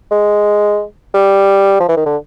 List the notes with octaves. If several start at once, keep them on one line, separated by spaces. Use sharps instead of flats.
G#3
G3
F3
E3
D#3
D3